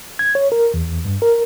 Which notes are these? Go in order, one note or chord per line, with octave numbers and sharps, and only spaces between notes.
G#6
C#5
A#4
E2
G2
A#4